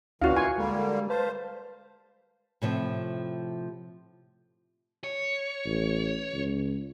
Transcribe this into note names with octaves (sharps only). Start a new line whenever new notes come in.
D2 A#2 E3 C#4 E4 F#4 F5
G#5 C6 C#6
D3 G3 G#3 A#3
B4 C5 F5 A5
A2 C3 F3
C#5
A1
C#2